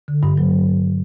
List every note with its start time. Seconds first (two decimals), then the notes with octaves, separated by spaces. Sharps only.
0.08 D3
0.23 G2
0.38 F#3